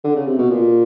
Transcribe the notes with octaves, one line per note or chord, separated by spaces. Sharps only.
D3
C#3
C3
B2
A#2